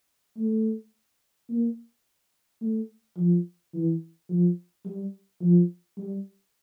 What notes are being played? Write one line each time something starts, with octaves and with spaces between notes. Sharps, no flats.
A3
A#3
A3
F3
E3
F3
G3
F3
G3